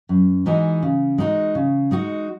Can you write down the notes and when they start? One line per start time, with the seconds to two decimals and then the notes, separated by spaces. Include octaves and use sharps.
0.09 F#2
0.46 E3 G#3 D#4 F#4
0.83 C#3
1.18 G#3 D#4 F#4
1.55 C#3
1.91 G#3 D#4 F#4